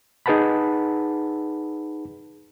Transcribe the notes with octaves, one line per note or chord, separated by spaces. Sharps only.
D#4 G#4 B4 F#5 A5 B5